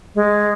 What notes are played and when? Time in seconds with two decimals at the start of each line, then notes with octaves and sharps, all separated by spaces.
0.15 G#3